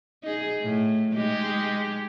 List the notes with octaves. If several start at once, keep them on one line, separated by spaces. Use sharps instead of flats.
D#4 G#4
A2
G#3 D#4 G4